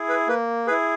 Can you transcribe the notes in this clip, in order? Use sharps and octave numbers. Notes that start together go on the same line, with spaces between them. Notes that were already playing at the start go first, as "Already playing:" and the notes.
Already playing: E4 G#4
B4
A#3 B4
E4 G#4 B4